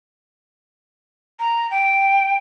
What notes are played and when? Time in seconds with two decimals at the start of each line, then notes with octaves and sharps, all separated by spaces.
1.39 A#5
1.71 G5